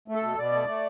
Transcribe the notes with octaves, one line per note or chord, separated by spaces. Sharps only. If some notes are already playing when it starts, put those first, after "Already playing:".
A3
A4
B2
B2 D5
A3
A3